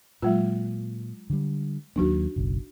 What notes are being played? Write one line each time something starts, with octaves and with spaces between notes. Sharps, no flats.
A#2 F#3 G#3 F4
D3 G3
D#2 F#3 A#3 D4 D#4 F#4
F#1 B1